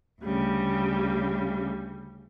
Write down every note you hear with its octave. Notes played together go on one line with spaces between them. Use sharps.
D2 C#3 G3